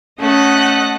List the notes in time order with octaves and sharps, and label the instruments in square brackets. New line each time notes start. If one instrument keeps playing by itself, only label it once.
[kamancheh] A3 [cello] C#4 [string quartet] D#5 F#5 F#6